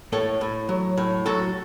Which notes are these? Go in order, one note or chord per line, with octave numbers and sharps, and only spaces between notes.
A2 A4 C#5
A2
F#3
A2
F#3 F#4 A4